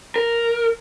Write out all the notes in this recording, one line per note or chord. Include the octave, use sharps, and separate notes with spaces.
A#4